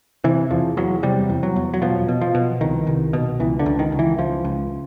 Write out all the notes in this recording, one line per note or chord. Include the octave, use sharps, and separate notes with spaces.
C3 E3
E2 F3
E2 F#3
C3 G3
E2
F#3
E2
F#3
B2 F3
B2
F3
B2
C2 D#3
C2
B2
C#2 E3
D3
C#2
D#3
C#2
E3
C#2 F3
C#2